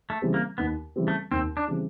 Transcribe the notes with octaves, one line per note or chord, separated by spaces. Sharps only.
A3
C#3 E3 G3 C4
A#3
D#2 B3
C#3 E3 G3 C4
A3
D#2 C4
D4
C#3 E3 G3 C4